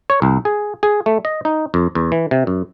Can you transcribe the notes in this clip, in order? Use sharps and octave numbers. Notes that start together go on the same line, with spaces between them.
C#5
C2
G#4
G#4
A3
D#5
D#4
F2
E2
E3
C3
F#2